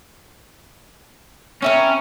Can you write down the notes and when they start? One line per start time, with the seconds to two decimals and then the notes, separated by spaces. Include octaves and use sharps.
1.62 C4 C#4 E4 A#4